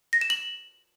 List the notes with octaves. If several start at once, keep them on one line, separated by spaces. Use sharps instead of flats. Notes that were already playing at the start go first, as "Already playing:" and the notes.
A#6
E7
F#7